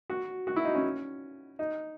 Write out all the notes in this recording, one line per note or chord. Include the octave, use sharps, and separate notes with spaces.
F#4
F#4
E4
D#4
C#4
D#4